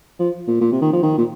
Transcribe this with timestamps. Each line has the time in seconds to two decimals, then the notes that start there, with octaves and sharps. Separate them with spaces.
0.19 F3
0.48 A#2
0.61 A#2
0.72 C3
0.81 D#3
0.93 F3
1.03 D#3
1.18 A#2